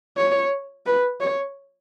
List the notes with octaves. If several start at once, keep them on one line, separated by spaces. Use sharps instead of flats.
C#5
B4
C#5